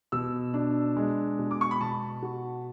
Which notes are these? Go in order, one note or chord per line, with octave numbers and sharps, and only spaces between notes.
B2 E6
D4
G#3
B2
D6
C#6
B5
B2 A5
F#4